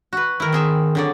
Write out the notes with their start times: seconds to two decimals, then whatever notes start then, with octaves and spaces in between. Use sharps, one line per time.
0.13 F#4 B4
0.40 D#3 E4 A#4
0.52 C4 G#4 E5
0.95 D3 F#3 D5